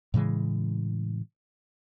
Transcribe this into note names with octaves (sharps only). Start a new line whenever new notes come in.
A2 C#3 E3 G#3